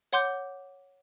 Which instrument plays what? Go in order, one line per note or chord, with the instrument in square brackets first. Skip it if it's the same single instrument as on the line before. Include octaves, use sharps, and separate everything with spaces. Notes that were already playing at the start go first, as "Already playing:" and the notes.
[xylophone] C#5 F#5 C6 D6 G6